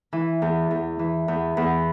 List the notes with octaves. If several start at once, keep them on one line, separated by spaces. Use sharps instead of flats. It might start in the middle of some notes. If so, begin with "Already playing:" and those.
E3
E2
E2
E3
E2
E2